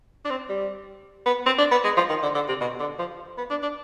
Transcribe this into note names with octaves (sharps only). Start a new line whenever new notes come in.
D4
C4
G3
B3
C4
D4
B3
G#3
F3
D#3
D3
D3
C3
B2
D3
F3
B3
D4
D4